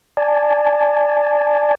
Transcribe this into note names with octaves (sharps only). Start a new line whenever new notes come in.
D5 G#5 A5